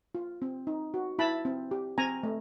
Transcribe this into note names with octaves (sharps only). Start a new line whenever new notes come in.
F4
C4
D#4
F#4
E4 A5 B5
C4
G4
C4 G#5 A#5
A3